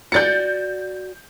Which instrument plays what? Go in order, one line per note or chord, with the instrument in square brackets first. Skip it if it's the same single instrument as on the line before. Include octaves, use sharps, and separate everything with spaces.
[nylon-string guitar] F#4 D5 [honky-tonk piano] G6 A6 C#7